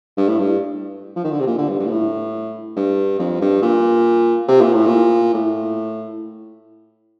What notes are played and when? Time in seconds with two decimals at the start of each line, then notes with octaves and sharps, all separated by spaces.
0.17 G2
0.28 A2
0.40 G2
1.16 F3
1.24 D#3
1.32 D3
1.40 C3
1.47 A#2
1.58 D3
1.69 G2
1.79 G2
1.86 A#2
1.90 A2
2.76 G2
3.19 F2
3.41 G2
3.62 A#2
4.48 C3
4.61 A#2
4.73 A2
4.86 A#2
5.34 A2